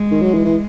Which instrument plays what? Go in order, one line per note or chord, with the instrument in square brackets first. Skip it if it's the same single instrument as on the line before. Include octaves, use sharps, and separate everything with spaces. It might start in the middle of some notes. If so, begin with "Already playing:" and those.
Already playing: [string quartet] G#3
[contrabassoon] D#3
F#3
E3
E3